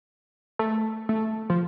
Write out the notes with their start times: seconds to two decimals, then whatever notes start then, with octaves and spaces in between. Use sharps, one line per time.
0.59 A3
1.09 A3
1.50 F3